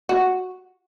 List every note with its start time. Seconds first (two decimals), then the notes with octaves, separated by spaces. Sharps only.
0.09 F#4